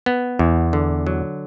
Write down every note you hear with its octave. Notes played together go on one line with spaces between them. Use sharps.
B3
E2
D3
F#3